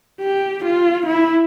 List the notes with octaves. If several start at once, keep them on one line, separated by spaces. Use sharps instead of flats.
G4
F4
E4